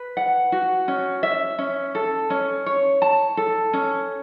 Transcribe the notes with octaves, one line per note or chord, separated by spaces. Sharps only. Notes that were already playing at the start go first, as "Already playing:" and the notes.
Already playing: B4
F#5
F#4
C#4
E5
C#4
A4
C#4
C#5
A5
A4
C#4